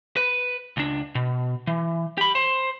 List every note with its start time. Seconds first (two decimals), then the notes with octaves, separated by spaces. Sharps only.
0.16 B4
0.77 C#2 D4
1.15 B2
1.67 E3
2.18 G4 B5
2.35 C5